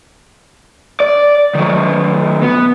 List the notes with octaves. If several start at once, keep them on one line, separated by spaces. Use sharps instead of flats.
D5
D#3 F#3
B3